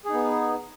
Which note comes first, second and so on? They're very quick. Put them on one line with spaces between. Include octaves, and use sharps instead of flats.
G#4 D#4 B3